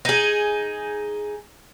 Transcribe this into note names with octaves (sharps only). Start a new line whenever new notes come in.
D#4 G#4